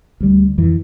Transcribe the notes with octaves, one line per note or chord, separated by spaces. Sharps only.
D2 G3
F2 E3